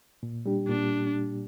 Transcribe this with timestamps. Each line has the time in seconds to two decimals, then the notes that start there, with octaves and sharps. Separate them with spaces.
0.23 A#2
0.46 G3 D4 G4
0.68 A#2 D4